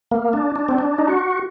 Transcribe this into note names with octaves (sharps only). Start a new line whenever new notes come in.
A#3
D4
D4
C4
D4
D#4
F#4